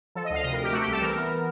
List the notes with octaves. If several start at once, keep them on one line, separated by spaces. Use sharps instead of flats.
F3 A4
D#5
D2 F5
C3 D#5
A#4
C3 G4
A3 F#4
G4
C2 A4
E3 A#4
B3